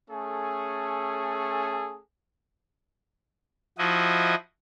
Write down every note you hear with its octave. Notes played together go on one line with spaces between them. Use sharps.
A3 C#4 G#4 A4 G#5
F3 E4 F#4 D#5